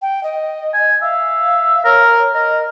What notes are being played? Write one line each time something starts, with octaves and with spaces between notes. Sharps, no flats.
G5
D#5
G#5
E5 F5
A#4 C#5
A#4 D#5